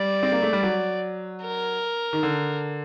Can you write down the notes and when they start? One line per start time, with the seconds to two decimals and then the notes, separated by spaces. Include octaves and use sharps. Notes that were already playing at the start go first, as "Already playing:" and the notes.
Already playing: G3 D5
0.23 C4
0.32 A#3
0.42 A3
0.53 G3
0.63 F#3
1.42 A#4
2.13 D#3
2.23 D3